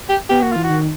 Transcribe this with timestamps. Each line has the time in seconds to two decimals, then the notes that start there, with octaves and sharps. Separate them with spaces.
0.10 G4
0.30 B3 G4
0.41 A#3 F#4
0.52 E3 F4
0.64 F#4
0.69 D#3